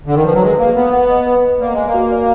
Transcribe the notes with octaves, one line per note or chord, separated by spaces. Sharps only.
D3
D#3
F3 B4
F#3
G#3 B4
A#3 B4
B3 B4
F#5
D#5
B4
D#5
A#3 D5
G#3 G#5
A#3
F#4
D5